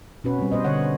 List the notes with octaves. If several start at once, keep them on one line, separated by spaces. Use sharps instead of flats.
B2 C#4 F#4 B4
G3 C4
B3 C5 D#5
D3 C#5 F#5